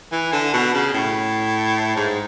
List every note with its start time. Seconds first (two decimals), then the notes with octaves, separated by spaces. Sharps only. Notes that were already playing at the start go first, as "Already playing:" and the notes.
0.12 E3
0.33 D3
0.54 B2
0.74 C#3
0.94 A2
1.96 G#2